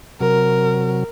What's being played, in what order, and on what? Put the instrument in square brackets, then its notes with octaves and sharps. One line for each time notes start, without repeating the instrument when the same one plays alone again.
[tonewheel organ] C3 F#3 [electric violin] A#4